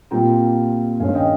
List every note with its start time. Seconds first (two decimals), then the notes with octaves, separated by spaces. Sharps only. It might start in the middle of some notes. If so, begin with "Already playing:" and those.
0.11 A#2 G3 C4 F4 G5 A#5
1.00 G2 D#3 G#3 C#4 F5 G#5
1.15 D#5 G5